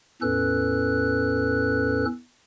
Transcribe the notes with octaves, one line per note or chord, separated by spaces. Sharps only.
E2 A2 C#4 A4 B4 F#6